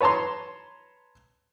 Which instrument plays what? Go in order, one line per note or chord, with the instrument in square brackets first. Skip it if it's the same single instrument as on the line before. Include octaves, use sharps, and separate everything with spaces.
[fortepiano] B4 C#5 A5 A#5 C6